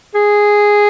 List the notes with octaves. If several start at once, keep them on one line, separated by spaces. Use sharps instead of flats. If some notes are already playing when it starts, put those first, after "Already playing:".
G#4